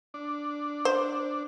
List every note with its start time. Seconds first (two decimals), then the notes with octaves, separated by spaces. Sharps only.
0.14 D4
0.85 C5